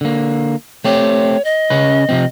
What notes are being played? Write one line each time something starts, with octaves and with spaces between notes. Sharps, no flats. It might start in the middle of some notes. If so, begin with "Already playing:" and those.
D3 A#3
A3 C4 G4 C#5
D#5
C#3 C#4 B4
C3 F3 C4